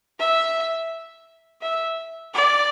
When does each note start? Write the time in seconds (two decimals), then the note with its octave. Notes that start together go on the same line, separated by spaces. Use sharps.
0.19 E5
1.62 E5
2.34 D5